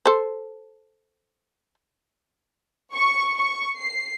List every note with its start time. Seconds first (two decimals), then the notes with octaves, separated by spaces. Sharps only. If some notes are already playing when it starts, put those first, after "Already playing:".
0.06 A4 C5
2.94 C#6
3.38 C#6
3.78 C7